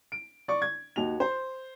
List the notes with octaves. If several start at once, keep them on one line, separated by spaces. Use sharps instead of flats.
D7
D5 C#6
G#6
D#2 D#4 F#4 F7
C5